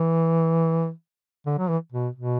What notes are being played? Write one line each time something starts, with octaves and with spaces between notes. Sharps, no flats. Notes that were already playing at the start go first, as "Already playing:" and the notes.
Already playing: E3
D3
F#3
E3
B2
B2